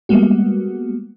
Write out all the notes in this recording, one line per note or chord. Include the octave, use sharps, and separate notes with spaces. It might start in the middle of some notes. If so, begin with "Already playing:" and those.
G3 G#3 A#3 B3 F#4